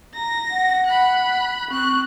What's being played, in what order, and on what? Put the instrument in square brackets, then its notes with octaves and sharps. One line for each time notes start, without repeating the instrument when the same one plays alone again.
[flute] A#5 [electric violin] A#6
[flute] F#5
[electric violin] B5 F#6
[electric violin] C4 F#6 [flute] C#6